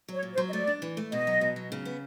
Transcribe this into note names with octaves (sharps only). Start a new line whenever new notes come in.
F#3
C#5
A#2
C5
F#3
D#5
A3 D5
D4
E3
A3
B2 D#5
F#3
B2
F#3
C#3
B3